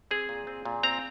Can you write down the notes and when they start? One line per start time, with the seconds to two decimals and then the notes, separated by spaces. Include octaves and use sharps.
0.11 C4 G#4
0.29 A#2
0.47 C4
0.65 A#2
0.83 C4 A#5